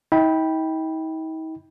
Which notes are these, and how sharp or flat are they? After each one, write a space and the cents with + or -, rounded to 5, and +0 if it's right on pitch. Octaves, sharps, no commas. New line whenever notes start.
D#4 +45 G5 +0 B5 -10